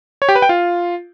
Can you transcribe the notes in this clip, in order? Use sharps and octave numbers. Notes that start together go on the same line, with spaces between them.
C#5
G4
B4
G5
F4